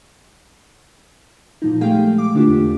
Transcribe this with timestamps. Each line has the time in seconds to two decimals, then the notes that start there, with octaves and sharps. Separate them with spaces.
1.62 A#2 F3 D#4
1.81 G#3 A3 G4 G#4 F5 G5
2.18 D6
2.34 D3 A3 D4 F4 G4
2.48 E2